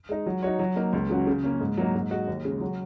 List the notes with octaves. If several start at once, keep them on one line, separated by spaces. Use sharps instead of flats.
G#3 D#4
F#3
D#4 F#4 C#5
F#3
A#3 D#4 A#4
C#2
C#3 F#3 C#4 F#4
C#3
A#3 C#4
G#2
F#3 A#3 D#4
G#2
G#3 F#4 D#5
D#2
C#3 G#3
F#3